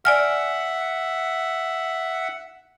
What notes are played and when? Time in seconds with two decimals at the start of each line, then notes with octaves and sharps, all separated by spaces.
0.05 D5 E5 F#5 G#5 F6